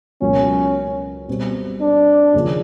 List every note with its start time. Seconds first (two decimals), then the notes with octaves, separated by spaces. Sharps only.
0.22 C#2 B2 F#3 A#3 C#4
1.28 B2 G3 C4
1.81 D4
2.34 D#2 C#3 F3